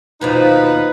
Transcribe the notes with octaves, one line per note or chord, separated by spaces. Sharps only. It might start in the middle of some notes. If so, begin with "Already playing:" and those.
D#2 B2 F3 D#4 B4